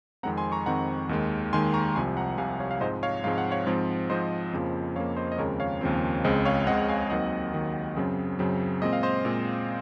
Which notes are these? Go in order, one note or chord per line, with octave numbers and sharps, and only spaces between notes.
F2 D#3 G#3 C4 F#5 A#5
G#5 C6
A#5 C#6
F2 D#3 G#3 C4 F#5 A#5
D#2 D#3 G#3
D#2 D#3 G#3 G#5 C6
A#5 C#6
C2 C3 F3 G#5 C6
F#5 A#5
C2 C3 F3 F5 G#5
C#5 F5
F5
G#2 F3 G#3 C4 C5 D#5
C#5 F5
G#2 F3 G#3 C4 F5
F#5
C#5 F5
G#2 F3 C4
G#2 F3 C4 C5 D#5
F2 C#3 F3 A#3
F2 C#3 F3 A#3 C#5 F5
C5 D#5
D#5
D#2 C#3 F3 G#3 C4 A#4 C#5
C#5 F5
D#2 C#3 F3 G#3 C4
C#2 C#3 G#3 C4 C5 D#5
C#5 F5
C#2 C#3 G#3 C4 D#5 F#5
F5 G#5
D#2 D#3 F#3 C4 D#5 F#5
D#2 D#3 F#3 C4
F#2 C#3 F#3 C4
F#2 C#3 F#3 C4
A#2 G#3 C4 D#5
F5
C5 D#5
A#2 G#3 C4